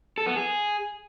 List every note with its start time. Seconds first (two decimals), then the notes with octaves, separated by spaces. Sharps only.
0.18 A4
0.27 B3
0.36 G#4